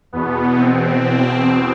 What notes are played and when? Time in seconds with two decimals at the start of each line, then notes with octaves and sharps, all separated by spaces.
0.12 E2 B2 B3
0.59 C4